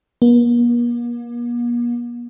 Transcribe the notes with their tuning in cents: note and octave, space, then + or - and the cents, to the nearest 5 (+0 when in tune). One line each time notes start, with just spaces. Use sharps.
A#3 +45